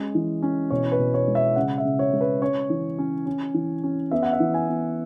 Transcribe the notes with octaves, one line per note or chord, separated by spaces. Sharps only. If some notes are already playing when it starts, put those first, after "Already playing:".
Already playing: G#3 C#4
E3
C#4
B2 C#5
B4
B2
C#5
G#3
E5
C#3 F#5
E5
C#3
C#5
G#3
B4
C#4 C#5
E3
C#4
C#4
E3
C#4
B3 E5
F#5
E5
E3
G#5
B3